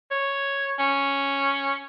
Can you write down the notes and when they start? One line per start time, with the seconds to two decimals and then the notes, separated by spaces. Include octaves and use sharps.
0.11 C#5
0.79 C#4